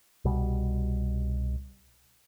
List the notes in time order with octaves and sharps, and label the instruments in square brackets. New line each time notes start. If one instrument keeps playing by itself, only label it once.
[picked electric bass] C2 B2 G3